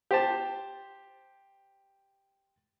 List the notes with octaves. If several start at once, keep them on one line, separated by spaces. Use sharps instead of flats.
G4 C5 A5